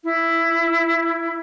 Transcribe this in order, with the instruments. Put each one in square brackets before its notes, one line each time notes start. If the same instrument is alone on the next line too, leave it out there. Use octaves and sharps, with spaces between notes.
[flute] E4